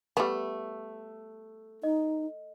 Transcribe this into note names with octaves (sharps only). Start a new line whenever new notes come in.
G3 A3 B3
D#4 D#5